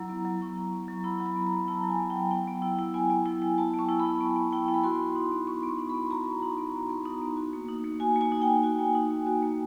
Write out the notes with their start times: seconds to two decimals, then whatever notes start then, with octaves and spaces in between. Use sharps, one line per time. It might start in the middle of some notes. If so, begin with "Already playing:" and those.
Already playing: F#3 E4 A#5
0.09 B3
0.25 F#3
0.41 E4 C#6
0.57 F#3
0.73 B3
0.88 F#3
1.04 E4 B5
1.20 F#3
1.26 B5
1.36 B3
1.47 A#5
1.52 F#3
1.68 E4 A5
1.84 F#3 G#5
1.99 B3
2.10 G5
2.16 F#3
2.31 B3 G5
2.47 B3
2.62 E4
2.79 E4
2.94 B3 G#5
3.10 B3
3.26 E4
3.42 E4
3.58 B3 A5
3.74 B3 C#6
3.89 E4
4.00 B5
4.05 E4
4.21 B3 A5
4.36 B3
4.52 E4 G5
4.68 E4
4.74 B5
4.84 F#4 C6
5.00 B3
5.16 D#4
5.32 B3
5.47 F#4 C#6
5.63 B3
5.69 C#6
5.78 D#4
5.89 B5
5.94 B3
6.10 F#4 A#5
6.26 B3
6.42 D#4
6.58 B3
6.74 F#4
6.89 B3
7.05 D#4
7.21 B3
7.37 F#4
7.53 A#3
7.68 D#4
7.84 A#3
8.00 F#4 G#5
8.16 A#3 G#5
8.32 D#4
8.42 G5
8.47 A#3
8.63 F#4 G#5
8.79 A#3
8.95 D#4
9.10 A#3
9.27 F#4
9.42 A#3